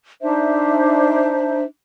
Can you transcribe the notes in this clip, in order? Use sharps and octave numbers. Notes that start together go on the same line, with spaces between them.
D4 D#4 C5 E5